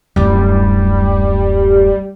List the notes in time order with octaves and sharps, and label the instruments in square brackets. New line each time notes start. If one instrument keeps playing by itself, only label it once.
[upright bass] D1 F#2 [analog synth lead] G3